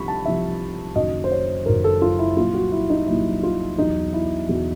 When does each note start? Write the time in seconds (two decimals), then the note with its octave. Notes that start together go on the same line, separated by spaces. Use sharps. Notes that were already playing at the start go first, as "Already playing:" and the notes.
Already playing: C2 C3 F3 B5 C#6
0.08 A5
0.25 C2 C3 F3 E5
0.95 F#1 F#2 D#3 F#3 D#5
1.24 C5
1.32 C#5
1.66 F#1 F#2 D#3 F#3 A#4
1.84 A4
2.02 F4
2.19 E4
2.37 C2 A#2 F#3 F4
2.54 F#4
2.72 E4
2.90 D#4
3.07 C2 A#2 F#3 E4
3.43 F4
3.78 E2 B2 F#3 D#4
4.13 E4
4.49 E2 B2 F#3 F#4